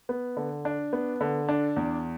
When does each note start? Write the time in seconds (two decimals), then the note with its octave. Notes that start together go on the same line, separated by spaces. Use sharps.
0.09 B3
0.37 D3
0.65 D4
0.93 B3
1.21 D3
1.49 D4
1.76 E2